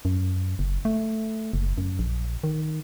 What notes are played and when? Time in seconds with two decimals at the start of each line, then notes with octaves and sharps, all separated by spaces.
0.05 F#2
0.59 F#1
0.85 A3
1.53 F#1
1.78 F#2
1.99 A#1
2.44 D#3